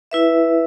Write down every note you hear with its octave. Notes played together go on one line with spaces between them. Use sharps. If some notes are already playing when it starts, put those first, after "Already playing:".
E4 B4 E5